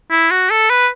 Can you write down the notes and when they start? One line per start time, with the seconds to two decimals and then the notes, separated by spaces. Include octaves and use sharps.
0.11 E4
0.31 F#4
0.50 A4
0.70 B4